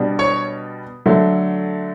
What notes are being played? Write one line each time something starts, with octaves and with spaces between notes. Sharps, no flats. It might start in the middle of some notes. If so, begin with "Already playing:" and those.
Already playing: B2 G3 D4
C#5 C#6
D3 F#3 A3